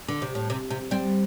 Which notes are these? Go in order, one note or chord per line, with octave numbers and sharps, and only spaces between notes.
D3
C3
A2
C3
C3
G3 C4